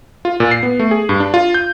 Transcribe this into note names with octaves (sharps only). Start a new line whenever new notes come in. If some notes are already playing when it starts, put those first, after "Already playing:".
F4
A#2
C7
B3
A3
G#4
G2
D4
F4
G6